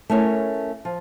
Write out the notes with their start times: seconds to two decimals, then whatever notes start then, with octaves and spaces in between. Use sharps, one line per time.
0.10 A3 C#4 E4 A#4 C#5
0.85 F3